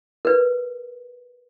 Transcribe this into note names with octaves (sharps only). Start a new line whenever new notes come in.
A#4 B4